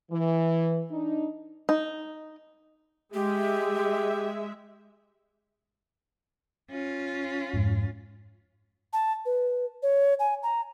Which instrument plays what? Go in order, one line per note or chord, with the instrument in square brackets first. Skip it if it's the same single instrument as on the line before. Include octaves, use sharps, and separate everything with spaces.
[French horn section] E3
D4 D#4
[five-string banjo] D#4
[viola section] G#3 E5 [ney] G4
[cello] C#4 F4
[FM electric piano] F2 G#2
[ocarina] A5
B4
C#5
G#5
A#5